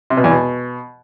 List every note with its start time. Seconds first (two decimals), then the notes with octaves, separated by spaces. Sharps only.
0.10 C3
0.17 B2
0.24 E2
0.31 B2